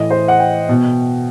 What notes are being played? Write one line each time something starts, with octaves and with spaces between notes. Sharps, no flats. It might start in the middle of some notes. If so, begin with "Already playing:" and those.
Already playing: A2 E3 D#5
C5
F#5
G5
B2